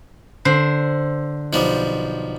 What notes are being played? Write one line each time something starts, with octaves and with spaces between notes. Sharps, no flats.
D3 C5
B1 F3 G3